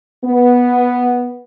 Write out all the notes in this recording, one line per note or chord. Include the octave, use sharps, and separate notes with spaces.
B3